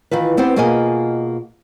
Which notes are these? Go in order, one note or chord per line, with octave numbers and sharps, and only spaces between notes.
D#3 E3 F4 B4
B3 C4 G4 B4 C5
B2 A#3 F4 G#4 D#5 G#5